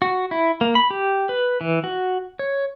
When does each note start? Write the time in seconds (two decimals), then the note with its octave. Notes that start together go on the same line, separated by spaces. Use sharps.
0.02 F#4
0.31 E4
0.61 A#3
0.75 B5
0.91 G4
1.29 B4
1.61 E3
1.84 F#4
2.39 C#5